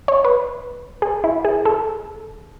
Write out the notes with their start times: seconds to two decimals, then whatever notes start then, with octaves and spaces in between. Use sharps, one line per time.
0.08 C#5
0.25 B4
1.02 G#4
1.24 E4
1.45 G#4
1.65 A4